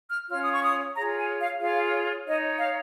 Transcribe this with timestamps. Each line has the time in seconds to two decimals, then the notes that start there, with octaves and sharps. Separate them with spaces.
0.08 F6
0.30 C#4 F4 C#5 F6
0.41 D#6
0.51 C#6
0.62 D#6
0.95 F4 G#4 C#5 A#5
1.17 G#5
1.40 F5
1.60 F4 G#4 C#5 F5
2.25 D#4 C#5 D#5
2.58 F5